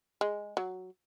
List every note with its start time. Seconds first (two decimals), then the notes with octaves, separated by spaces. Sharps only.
0.21 G#3
0.57 F#3